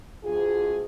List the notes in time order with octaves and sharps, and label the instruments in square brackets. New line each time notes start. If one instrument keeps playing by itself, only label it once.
[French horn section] D2 F4 G#4